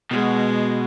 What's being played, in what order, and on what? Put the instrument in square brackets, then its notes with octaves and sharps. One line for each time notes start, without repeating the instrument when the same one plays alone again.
[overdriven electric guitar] B2 [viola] G#3